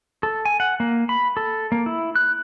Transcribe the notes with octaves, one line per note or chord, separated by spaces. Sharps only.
A4
G#5
F#5
A#3
B5
A4
A#3
E4
F#6